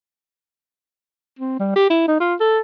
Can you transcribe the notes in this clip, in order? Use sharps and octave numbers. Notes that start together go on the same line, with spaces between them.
C4
G3
G4
E4
D#4
F4
A4